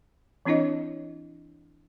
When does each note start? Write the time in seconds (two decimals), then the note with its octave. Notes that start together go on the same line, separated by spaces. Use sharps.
0.45 E3 C4 D4 E4 C#5 D#5